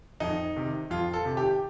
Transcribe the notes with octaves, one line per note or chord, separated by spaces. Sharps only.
F2 D#4
C3 D#3
F2 F4
A4
C3 D#3
G4